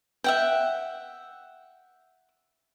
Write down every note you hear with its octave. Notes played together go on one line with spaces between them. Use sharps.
E5 F#5 G5